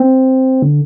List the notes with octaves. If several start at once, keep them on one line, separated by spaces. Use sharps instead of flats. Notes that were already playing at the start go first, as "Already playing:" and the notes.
Already playing: C4
D3